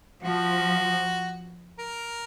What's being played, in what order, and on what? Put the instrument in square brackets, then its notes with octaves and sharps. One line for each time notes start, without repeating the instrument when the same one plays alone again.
[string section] F3 [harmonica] F#4
[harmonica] A#4